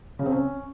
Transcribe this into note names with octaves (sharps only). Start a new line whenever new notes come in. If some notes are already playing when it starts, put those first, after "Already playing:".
C#3
C4
C#4